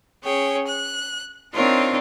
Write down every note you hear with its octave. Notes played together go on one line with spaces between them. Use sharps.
C#4 G#4 C#5 G5
F#6
C4 D4 D#4 F4 A#4 C#5